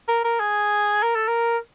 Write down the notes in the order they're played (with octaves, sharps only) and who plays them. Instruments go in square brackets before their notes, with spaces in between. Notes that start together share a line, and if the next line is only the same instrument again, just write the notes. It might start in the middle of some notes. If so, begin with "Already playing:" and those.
[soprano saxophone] A#4
A#4
G#4
A#4
A4
A#4